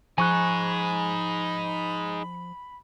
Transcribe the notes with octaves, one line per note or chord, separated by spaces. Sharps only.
F3 D#4 G#4 G#5 B5 C#6 F#6